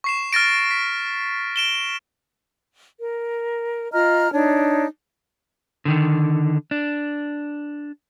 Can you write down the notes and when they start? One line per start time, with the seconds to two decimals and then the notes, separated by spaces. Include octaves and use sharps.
0.04 C#6 C7 E7
0.33 F6 A6 A#6 D7
0.71 B6
1.56 D7 E7 G7
3.00 A#4
3.92 F4 D#5 A#5 F6
4.33 D4 D#4 C#5
5.85 D3 D#3
6.71 D4